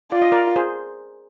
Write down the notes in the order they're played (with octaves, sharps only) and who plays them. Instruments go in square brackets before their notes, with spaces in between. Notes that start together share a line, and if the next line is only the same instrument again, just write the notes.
[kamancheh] F4 [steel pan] D5
[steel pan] D#5
A#4 D5
G#4 C5